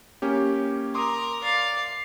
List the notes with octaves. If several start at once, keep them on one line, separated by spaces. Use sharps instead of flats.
A#3 C#4 G4
A#4 C6 D6 D#6
D5 F5